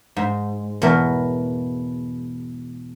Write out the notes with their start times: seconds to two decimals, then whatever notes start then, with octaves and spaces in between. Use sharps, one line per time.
0.16 G#2
0.82 E2 B2 B3 A#4